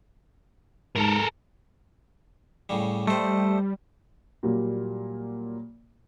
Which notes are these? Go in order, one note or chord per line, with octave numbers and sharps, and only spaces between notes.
G#2 A4 A#4
A2 C#3 G3
G3 A3 C5 D#5
A#2 F#3 G3 A#3